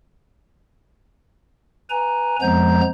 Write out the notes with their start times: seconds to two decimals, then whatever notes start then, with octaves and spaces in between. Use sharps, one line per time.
1.90 B4 G#5 A#5
2.42 F2 F3 G#3 B3 A#5 G6